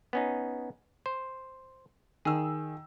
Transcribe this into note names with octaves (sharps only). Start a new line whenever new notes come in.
B3 C#4 D#4
C5
D#3 G#4 E6